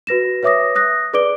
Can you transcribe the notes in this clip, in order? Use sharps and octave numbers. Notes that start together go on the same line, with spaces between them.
F#4 B4 A#6 E7
B4 C#5 E5 D6 D#6 A#6
D#6 F#6 A#6
G#4 B4 D5 D6 D7 G7